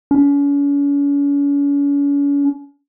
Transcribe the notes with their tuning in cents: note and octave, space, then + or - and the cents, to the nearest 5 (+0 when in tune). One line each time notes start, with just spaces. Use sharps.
C#4 +40